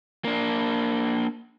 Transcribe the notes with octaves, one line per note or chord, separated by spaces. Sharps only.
A#3 D4